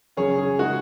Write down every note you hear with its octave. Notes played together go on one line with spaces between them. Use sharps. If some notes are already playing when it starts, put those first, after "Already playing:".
C#3 F#3 C#4 G#4 C#5
G#4
C#3 G#3 D#4 F#4